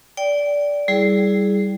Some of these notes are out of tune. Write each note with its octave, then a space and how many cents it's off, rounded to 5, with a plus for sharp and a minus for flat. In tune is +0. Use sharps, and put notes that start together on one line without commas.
D5 -15 G5 +0
G3 +0 E4 +0 G#4 +5